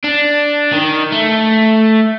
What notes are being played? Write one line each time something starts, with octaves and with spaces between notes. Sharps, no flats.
D4
D#3
A3